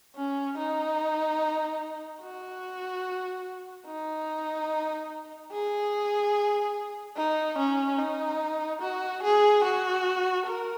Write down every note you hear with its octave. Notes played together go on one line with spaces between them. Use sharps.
C#4
D#4
F#4
D#4
G#4
D#4
C#4
D#4
F#4
G#4
F#4
A#4